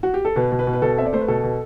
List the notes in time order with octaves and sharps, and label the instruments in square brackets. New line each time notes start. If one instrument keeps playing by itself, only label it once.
[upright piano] F#4
G4
A4
B2 B4
B2
B4
B2
B4
B2 A4
C4 E5
D5
A3 C5
B4
B2 A4
B2